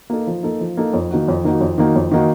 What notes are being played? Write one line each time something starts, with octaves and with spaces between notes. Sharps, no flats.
A#3 D#4 A4
F3
A#3 D#4 A4
F3
A#3 D#4 A4
F2
D#3 A#3 D#4 F#4
F2
D#3 A#3 D#4 F#4
F2
D#3 A#3 D#4 F#4
F2
D#3 A#3 D#4 F#4